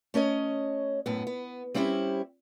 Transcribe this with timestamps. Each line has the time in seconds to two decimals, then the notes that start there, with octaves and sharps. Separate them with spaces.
0.14 A3 C#4 C#5 D#5
1.06 F#2 A2 B3
1.27 B3
1.74 G3 C4 C#4 E4 F#4 G4